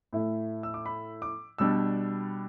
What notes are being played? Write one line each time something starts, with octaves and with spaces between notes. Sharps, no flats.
A2 A3 E4
E6
D6
B5
D6
B2 G3 D4 E6